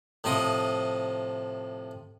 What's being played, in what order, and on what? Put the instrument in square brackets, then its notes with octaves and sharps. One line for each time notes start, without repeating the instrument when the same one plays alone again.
[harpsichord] A2 C3 F3 D#5 D#6